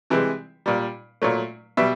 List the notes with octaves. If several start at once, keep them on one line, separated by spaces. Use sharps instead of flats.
C3 E3 G#3
A#2 G3
A#2 F#3 A3
B2 G3 E5